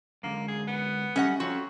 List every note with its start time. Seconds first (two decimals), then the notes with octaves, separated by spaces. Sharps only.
0.23 F#2 D3 G#3 A#3
0.48 G#4
0.68 B3
1.16 F#2 G3 A3 C#4 D#5 F#5
1.40 F2 F3 C#4 F#4